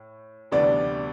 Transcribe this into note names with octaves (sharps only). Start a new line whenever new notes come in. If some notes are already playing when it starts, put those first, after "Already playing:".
Already playing: A2
D2 C3 E3 G3 B3 D4 D5